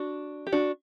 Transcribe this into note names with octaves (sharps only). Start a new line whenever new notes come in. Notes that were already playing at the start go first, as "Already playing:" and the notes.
Already playing: D4 F#4
G4
D4 F#4